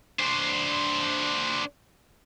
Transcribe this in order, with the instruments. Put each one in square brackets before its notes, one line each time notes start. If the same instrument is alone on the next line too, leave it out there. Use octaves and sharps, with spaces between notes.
[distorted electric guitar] D4 C5